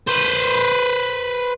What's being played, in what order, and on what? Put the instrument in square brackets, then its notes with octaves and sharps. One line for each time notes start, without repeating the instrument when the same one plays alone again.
[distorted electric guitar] B4 C5